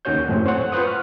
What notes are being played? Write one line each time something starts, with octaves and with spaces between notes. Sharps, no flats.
D#2 D#3 C#4 F#4 C#5 G6
F#2 A2 A3 C4 C#4
C5 C#5 F#5
F4 B4 C5 F#5 C#6 D#6
F6